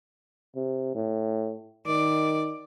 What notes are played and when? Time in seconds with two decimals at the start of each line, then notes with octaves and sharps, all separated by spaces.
0.55 C3
0.95 A2
1.87 D#3 D5